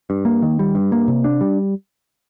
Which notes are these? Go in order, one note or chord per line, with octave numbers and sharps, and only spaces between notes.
G2
A#3
D#3
G3
G2
A#3
C3
D4
G3